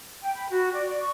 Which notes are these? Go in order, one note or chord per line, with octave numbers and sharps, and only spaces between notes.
G5
B5
F#4
D5
D5
C#6